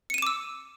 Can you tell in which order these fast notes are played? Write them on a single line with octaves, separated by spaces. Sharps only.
C#7 D#7 E7 D6 E6